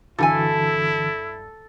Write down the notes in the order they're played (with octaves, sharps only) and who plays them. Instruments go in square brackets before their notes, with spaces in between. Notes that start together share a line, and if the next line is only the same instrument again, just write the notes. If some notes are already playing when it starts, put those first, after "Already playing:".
[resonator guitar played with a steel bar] G2 G4 G#5 [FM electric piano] D3 E3 F#4 [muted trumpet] E4 [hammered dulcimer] A4